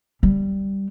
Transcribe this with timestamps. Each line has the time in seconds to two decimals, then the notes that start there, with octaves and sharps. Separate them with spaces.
0.23 G3